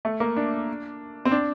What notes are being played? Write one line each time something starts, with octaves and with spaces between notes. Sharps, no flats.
A3
A#3
D4
C4
D4